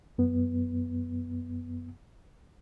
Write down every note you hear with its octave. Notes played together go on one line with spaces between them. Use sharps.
F#2 B3